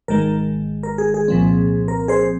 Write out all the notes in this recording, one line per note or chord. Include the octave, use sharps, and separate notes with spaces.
G#1 G#2 D#3 G#3 A#4
A#4
G#4
G#4
C2 A#2 F3 C4
A#4
G#4 C5